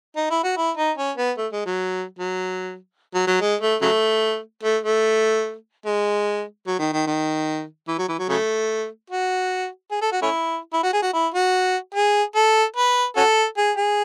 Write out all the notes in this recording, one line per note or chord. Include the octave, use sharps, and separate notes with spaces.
D#4
E4
F#4
E4
D#4
C#4
B3
A3
G#3
F#3
F#3
F#3
F#3
G#3
A3
C#3 F#3 A3
A3
A3
G#3
F#3
D#3
D#3
D#3
E3
F#3
E3
F#3
C#3 F#3 A3
F#4
G#4
A4
F#4
A3 C#4 E4
E4
F#4
G#4
F#4
E4
F#4
G#4
A4
B4
C#4 F#4 A4
G#4
G#4